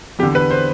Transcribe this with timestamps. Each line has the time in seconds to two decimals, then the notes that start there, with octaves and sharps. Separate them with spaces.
0.19 E2 G4
0.23 D3
0.35 B4
0.51 C5